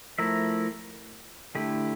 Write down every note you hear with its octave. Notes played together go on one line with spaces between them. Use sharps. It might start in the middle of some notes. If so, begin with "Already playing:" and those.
F3 A3 E4 A#4 E5
D3 A3 E4 G4